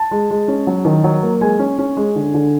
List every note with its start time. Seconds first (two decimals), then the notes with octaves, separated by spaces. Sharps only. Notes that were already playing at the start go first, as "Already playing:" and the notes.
Already playing: A5
0.11 G#3
0.30 G#3
0.48 C#4
0.67 F#3
0.85 D#3
1.04 F#3
1.23 A#3
1.41 G#3 G#5
1.59 C#4
1.79 C#4
1.97 G#3
2.16 D3
2.34 D3